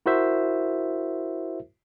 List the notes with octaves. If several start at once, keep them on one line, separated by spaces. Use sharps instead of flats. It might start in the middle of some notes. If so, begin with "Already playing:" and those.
E4 F#4 A#4 C5 E5